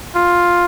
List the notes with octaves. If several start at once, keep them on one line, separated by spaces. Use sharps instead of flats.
F4